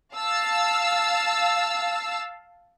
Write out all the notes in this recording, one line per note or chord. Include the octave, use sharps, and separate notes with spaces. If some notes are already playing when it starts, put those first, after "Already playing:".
F5 A5 E6